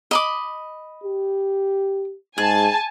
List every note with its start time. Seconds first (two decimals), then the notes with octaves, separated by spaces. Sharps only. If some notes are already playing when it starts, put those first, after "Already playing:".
0.11 D#5 B5 D6
1.04 G4
2.38 G#2 G#4 G#5 A5